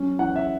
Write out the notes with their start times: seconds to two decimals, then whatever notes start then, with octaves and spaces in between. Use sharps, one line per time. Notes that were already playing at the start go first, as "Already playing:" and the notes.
Already playing: F#3 C#4
0.18 E3 F#5
0.36 E5